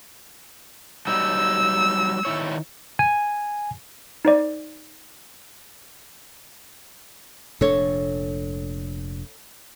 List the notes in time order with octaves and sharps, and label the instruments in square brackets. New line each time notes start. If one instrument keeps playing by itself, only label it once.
[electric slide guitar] F#3 G3 D#4 [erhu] E6
[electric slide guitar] D#3 E4 C#5
[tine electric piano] G#5
[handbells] D#4 C5 D5
[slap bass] F1 A#2 D4 [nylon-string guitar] A4 C#5